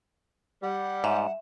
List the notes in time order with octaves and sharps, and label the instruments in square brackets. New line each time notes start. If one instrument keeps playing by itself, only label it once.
[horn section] G3 [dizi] F#5
[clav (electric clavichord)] G#2 [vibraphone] E5